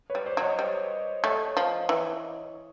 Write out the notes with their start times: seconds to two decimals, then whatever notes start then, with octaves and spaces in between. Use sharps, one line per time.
0.10 B4 C#5
0.15 G3
0.26 C5 D5
0.37 F#3
0.43 C#5 D#5
0.59 G3
1.24 A3 C#5 D#5
1.57 F3
1.89 E3